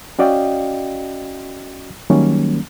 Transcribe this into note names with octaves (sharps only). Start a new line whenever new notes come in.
C#4 F#4 D5 D#5 F5 G5
D#3 F#3 G3 A#3 C#4